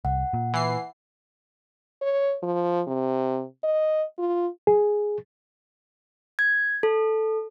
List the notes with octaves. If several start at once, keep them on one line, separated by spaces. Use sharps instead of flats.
C2 F#5
A#2
E3 C7
C#5
F3
C3
D#5
F4
G#4
G#6
A4